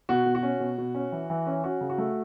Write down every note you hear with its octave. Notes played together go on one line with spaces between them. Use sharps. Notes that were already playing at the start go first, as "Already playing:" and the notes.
B2 F#4
B2
F#4
C#4
B2
B2
C#4
E3
E3
C#4
C#4 F#4
C#3
F#4
A3